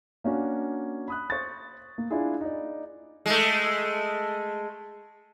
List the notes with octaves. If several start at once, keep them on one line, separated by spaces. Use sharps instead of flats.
A#3 C#4 D4 F#4
B5 D#6 F#6
C5 C#6 A6
A#3
D4 E4 F4 G#4
D#4 D5
G#3 A3